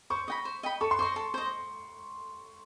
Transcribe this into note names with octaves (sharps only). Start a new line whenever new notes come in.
C5 C#6
D#5 G5 B5
C5
D#5 G5 B5
A4 C#6
C6
C5 D#5 C#6
A4
C5 D#5